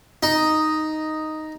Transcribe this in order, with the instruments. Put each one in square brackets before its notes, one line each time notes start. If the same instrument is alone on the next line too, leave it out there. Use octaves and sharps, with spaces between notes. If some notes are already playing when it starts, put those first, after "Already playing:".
[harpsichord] D#4